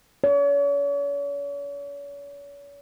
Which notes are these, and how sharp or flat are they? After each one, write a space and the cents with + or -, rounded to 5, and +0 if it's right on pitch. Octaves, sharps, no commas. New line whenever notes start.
C#5 +40